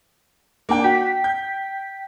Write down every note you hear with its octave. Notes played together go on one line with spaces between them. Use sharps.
A#3 D4 G5
F#4 G5 B6
G6